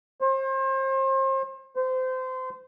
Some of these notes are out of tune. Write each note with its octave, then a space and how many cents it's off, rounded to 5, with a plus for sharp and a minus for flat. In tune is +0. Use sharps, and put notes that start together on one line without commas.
C5 +35
C5 -25